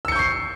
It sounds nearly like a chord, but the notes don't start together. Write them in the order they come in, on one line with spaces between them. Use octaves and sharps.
E6 C#7 G6 C#6 C7